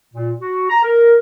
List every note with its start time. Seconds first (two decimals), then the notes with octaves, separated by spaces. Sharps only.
0.15 A#2
0.41 F#4
0.70 A#5
0.83 A#4